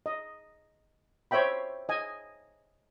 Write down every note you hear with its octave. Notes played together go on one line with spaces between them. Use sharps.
D#5
C5 C#5 E5 G5 B5
D#5 G#5